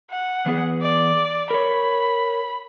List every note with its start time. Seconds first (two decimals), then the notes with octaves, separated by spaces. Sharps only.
0.11 F#5
0.46 E3 B3 G#4
0.82 D5
1.51 A#4 C#5 B5